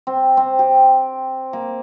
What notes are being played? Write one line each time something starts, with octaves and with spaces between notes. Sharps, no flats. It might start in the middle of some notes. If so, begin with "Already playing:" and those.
C4
C4
G4
A#3